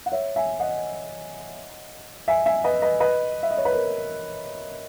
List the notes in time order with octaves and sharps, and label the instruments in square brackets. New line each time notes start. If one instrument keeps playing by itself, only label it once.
[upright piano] F#5
C#5 E5
E5 G#5
D#5 F#5
E5 G#5
E5 G#5
B4 D#5
B4 D#5
B4 D#5
E5
D#5
C#5
B4
A#4